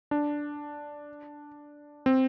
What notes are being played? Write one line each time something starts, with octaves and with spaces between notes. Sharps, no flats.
D4
C4